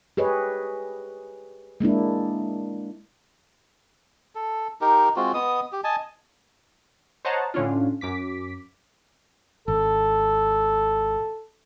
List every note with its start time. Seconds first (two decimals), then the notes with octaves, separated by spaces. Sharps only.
0.17 G4 G#4 B4 C#5 D#5
1.80 G#3 A#3 D4 E4
4.35 A4
4.81 D#4 G4 A#4
5.16 G#3 C4 F4 F#4
5.34 B3 D#5 D#6
5.72 G4
5.84 D#5 G#5 A5
7.25 C5 C#5 D#5 F#5 A5 A#5
7.54 A2 D3 C#4 D4 F4
8.01 F#2 D6 B6
9.68 G#1 A4